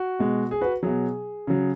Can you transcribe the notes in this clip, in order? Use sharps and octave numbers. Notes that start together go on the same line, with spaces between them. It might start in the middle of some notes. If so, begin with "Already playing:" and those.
Already playing: F#4
B2 G#3
G#4
F#4 B4
B2 F#3 G#4
C#3 F#3